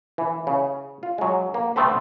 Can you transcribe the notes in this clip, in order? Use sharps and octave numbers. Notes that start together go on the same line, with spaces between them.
E3
C#3
F4
F#3 G#3
A#3
A3 B3 C4 A4 B4